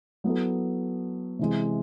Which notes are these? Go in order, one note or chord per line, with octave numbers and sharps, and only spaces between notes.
F#3 B3 E4 A4
C3 E3 G#3